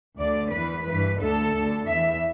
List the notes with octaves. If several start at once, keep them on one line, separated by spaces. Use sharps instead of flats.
D2 D3 D5
E2 E3 B4
G2 E3 B4
D2 D3 A4
D2 D3
E2 E3 E5